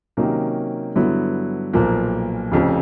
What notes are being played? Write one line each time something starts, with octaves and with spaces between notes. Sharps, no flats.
C3 D#3 F#3 A#3 C#4
G2 D3 F#3 B3 E4
B1 A#2 F3 A#3
F1 F2 C#3